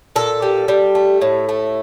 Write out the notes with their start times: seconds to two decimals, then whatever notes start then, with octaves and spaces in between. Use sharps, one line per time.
0.16 A#2 A4
0.42 G3
0.68 G3
0.95 A3
1.22 A2
1.49 A3